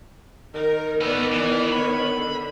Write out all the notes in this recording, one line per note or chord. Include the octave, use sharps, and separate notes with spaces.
D#3 A#4
A3 B3 B4 D5
E3
D3 B3 C#5 B5
D3